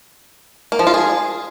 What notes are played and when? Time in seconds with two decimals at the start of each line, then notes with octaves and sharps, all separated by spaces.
0.72 A#3
0.79 F3
0.87 F4
0.94 G#4